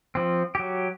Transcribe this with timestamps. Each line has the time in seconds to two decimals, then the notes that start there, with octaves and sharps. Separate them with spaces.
0.15 F3 C4
0.55 F#3 G4